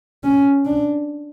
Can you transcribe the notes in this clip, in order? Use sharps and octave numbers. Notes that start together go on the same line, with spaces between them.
C#4
D4